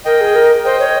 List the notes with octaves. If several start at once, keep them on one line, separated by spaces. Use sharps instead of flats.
A#4 D#5 G5
G#4
A#4
C5 D#5 G5
C#5